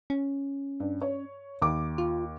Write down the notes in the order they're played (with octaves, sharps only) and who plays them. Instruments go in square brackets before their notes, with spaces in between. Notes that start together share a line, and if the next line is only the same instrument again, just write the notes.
[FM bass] C#4
[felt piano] G2
C#5
D#2 D6
[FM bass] F4